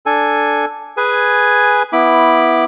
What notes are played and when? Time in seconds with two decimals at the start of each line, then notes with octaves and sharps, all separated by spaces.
0.06 D4 A4 G#5
0.97 G#4 B4 G#5
1.93 B3 E4 B5 D6